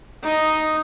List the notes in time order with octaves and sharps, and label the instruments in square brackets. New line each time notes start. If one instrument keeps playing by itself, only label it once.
[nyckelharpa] D#4 D#5